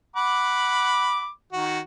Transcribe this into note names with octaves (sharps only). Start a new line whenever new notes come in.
F#5 B5 D6
D#3 F#4